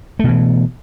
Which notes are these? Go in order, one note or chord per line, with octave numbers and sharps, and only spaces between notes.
B2 E3 A3